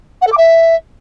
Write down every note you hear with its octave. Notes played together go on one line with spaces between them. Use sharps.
F#5
A4
D6
E5